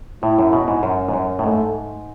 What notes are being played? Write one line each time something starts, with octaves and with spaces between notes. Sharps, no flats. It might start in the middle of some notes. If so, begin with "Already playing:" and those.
A2 E4
F#2
B2
G#2
F#2
G#2
F#2
A2
G#2 A3